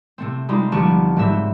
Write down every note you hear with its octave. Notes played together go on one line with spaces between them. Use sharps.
C3 A3 C4
G3 G#3 C4 D#4 F4
G1 F3 G4 A5 C#6
G#2 F#3 G3 C4 E5